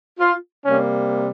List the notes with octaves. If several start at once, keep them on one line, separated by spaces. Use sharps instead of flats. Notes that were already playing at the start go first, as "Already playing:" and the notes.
F4
C3 G3 A#3 C#4